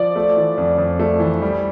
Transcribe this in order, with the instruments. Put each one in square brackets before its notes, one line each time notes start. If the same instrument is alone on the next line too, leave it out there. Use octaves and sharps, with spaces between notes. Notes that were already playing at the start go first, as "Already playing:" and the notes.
Already playing: [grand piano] F3 [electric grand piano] D5
[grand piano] A3
E3
F2
F2
A3
E3
G3